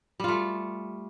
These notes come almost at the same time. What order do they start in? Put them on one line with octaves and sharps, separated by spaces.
G3 F4 A3